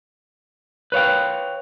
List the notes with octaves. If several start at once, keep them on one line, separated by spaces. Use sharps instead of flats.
B4 C#5 F5 G5